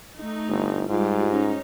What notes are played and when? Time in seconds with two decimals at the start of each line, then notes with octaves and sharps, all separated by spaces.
0.17 A3 D#4
0.49 G1
0.89 G#2 G3 F4
1.31 C#4 D#4